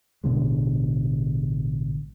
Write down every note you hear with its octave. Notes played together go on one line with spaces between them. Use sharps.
A1 B2 D3 G#3